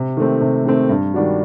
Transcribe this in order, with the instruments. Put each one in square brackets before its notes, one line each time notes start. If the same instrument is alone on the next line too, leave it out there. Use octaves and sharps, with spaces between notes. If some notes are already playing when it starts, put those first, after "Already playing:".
Already playing: [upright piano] C3
D#3 A3 C4
C3
D#3 A3 C4
G2
D#3 G3 D4 F#4